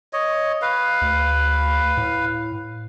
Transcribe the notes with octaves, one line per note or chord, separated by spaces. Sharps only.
C#5 D#5
B4 F5
D2
A2